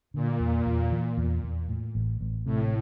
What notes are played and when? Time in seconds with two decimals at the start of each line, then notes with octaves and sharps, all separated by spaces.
0.14 A#2 D3
0.40 E2
0.66 E2
0.92 E3
1.17 E2
1.43 E2
1.68 A2
1.95 A1
2.21 A1
2.45 A2 C3